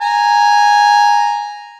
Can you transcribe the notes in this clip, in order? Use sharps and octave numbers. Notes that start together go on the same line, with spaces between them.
G#5 A#5